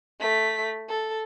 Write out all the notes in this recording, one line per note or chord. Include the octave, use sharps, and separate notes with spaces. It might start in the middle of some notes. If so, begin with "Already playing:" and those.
A3 B6
A4